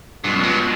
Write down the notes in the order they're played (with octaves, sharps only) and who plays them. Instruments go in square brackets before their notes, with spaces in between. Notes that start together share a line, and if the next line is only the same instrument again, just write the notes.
[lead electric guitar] G2 [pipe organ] B2 G#3 B3 D4 F4
[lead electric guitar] F#2
G2